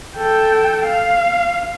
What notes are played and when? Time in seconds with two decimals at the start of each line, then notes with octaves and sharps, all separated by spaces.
0.17 A4 G5
0.85 F5